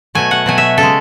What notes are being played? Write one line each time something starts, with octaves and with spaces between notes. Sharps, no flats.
B2 F#3 A3 G#5
F#5
B2 F#3 A3 G#5
E5
C#3 A4
G#3